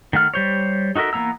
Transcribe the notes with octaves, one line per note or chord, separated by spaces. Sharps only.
D#3 A3 F#5 F6
G3 C5 C#5
D#4 F#4 A4 A#4 E5
E3 A#3 B3 A#5 E6